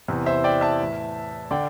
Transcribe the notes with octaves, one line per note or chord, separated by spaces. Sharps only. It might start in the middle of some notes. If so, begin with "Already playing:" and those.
E2 C3 E3
C5 E5
D5 G5
E5 A5
A2 E3
D3 D5 G5